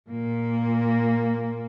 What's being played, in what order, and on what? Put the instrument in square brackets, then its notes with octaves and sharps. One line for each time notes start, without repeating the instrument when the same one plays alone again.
[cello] A#2 A#3